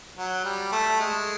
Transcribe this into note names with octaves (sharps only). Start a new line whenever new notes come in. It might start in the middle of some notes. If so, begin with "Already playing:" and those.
F#3
G3
A3
G#3